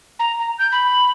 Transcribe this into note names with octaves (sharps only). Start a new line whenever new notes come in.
A#5
A#5
G6
B5